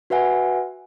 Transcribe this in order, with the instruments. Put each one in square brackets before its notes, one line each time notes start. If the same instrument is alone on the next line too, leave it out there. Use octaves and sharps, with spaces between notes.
[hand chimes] F#4 B4 E5 F#5 G#5